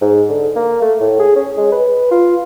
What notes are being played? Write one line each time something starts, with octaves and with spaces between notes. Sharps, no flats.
G#2
D3
A#3
A3
A2
G#4
C#4
G#3
B4
F4